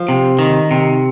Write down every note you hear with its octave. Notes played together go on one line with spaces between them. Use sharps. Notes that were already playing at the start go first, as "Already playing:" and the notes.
Already playing: F3
C3
D#3
C3